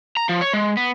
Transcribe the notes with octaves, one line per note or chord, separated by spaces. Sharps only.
A#5
F3
C#5
G#3
B3